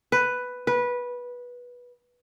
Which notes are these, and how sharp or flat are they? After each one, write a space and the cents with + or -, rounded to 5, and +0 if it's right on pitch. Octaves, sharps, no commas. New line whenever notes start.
B4 +5
B4 -15